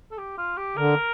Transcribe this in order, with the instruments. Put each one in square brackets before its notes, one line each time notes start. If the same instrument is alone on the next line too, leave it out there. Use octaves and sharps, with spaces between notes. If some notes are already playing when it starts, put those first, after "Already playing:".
[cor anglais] A4
G4
F4
G4
[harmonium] D3 [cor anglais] A#4